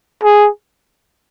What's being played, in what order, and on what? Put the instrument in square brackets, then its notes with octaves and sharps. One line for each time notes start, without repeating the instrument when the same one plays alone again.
[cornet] G#4